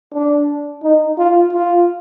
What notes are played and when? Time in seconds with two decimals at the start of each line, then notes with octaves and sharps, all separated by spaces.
0.13 D4
0.83 D#4
1.18 F4
1.52 F4